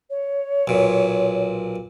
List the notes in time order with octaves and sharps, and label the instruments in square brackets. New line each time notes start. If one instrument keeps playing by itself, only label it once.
[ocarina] C#5
[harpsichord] B1 A#2